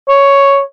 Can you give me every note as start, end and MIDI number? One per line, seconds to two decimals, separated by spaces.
0.08 0.60 73